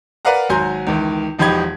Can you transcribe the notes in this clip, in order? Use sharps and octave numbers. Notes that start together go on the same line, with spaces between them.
A#4 B4 D5 F5 F#5 A#5
G#1 F#3 G#5 A#5 C6 G6
C#2 D#3 E3
E1 F3 D#4 G4 B5 G#6